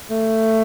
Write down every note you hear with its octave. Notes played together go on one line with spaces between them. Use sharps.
A3